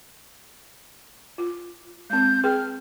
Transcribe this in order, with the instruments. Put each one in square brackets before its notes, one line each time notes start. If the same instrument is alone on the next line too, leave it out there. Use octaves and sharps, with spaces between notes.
[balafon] F4
[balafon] G#3 C4 [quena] G6
[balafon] G#4 B4 G5 [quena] F6